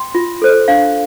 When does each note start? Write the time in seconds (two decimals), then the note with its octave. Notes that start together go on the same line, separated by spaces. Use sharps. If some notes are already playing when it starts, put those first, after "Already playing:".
Already playing: G5 C6
0.15 F4
0.42 A4 C5
0.68 D4 F5